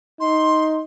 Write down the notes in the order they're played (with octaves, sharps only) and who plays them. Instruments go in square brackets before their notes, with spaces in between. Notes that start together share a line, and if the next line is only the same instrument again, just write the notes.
[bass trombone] D#4 [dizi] C6